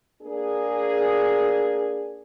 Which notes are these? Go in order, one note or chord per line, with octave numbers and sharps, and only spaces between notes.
A#3 D4 G#4